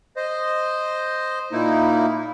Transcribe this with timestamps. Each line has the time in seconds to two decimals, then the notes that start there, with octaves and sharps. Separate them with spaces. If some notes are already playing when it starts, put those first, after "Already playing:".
0.17 C5 D#5
1.52 A#2 A#3 D#4 E4